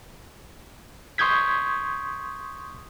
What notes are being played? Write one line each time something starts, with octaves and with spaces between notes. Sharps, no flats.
C6 C#6 D#6 G6 G#6 B6